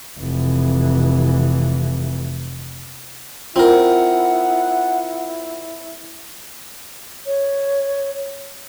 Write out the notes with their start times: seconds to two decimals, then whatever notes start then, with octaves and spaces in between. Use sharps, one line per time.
0.19 F1 E3
3.56 C4 E4 F4 A#4 F#5
7.26 C#5